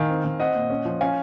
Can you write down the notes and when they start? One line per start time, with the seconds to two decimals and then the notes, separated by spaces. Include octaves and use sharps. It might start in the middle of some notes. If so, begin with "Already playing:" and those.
Already playing: D#3 F5 G#5
0.09 C4
0.25 D#3
0.40 C4 D#5 F#5
0.55 A#2
0.70 C#4
0.85 F3
1.01 C#4 F5 G#5